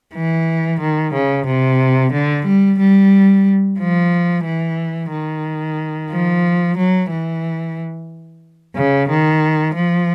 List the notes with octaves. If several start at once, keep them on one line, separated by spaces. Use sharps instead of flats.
E3
D#3
C#3
C3
D3
G3
G3
F3
E3
D#3
F3
F#3
E3
C#3
D#3
F3